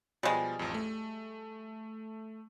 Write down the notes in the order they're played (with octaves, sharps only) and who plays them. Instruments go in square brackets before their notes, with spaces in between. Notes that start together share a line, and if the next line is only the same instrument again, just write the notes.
[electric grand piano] B2 F3 [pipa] G3 G#3
[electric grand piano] A1 F2
A3